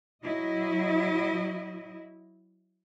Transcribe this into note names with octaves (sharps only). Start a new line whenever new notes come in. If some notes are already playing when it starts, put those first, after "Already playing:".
F#3 E4 D#5